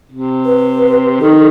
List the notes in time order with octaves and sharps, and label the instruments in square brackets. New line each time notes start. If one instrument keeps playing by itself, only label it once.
[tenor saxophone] C3
[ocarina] B4
[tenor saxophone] D#3 [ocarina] A4